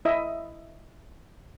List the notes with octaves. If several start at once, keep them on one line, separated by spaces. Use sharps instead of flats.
E4 D#5 E5